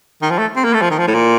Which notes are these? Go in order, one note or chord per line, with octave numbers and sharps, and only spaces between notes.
D#3
F3
A3
C4
A#3
A3
F3
D#3
F3
A2
A#2